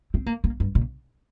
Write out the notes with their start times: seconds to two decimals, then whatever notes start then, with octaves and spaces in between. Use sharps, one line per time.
0.14 C4
0.26 A#3
0.44 A#3
0.60 G2
0.75 A#2